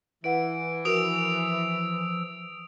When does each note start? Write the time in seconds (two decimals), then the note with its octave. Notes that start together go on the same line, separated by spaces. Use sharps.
0.24 E3 E4 B4 F#5 D7
0.85 F3 F#4 A#4 D#6 E6 D7 F7